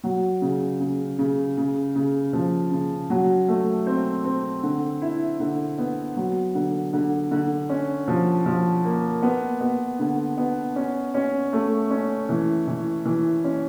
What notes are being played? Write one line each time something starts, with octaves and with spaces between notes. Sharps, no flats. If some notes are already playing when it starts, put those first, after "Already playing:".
F#3
C#3
C#3
C#3
C#3
C#3
F3
C#3
F#3
A3
C4
C4
D3
E4
D3
B3
F#3
D3
D3
D3
C#4
F3
F3
A#3
B3
B3
D3
B3
C#4
C#4
A3
C#4
E3
E3
E3
C#4